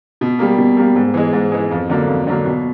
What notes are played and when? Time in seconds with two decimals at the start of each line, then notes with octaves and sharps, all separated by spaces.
0.21 B2
0.39 G3 A#3
0.58 B2
0.77 G3 A#3
0.96 G#2
1.14 E3 G#3
1.33 G#2
1.52 E3 G#3
1.71 F2
1.90 D3 F#3 A#3
2.08 F2
2.27 D3 F#3 A#3
2.45 B2